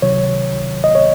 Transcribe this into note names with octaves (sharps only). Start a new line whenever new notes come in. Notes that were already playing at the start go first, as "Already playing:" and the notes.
C#2 C3 D#3 F#3 C#5
D#5
C#5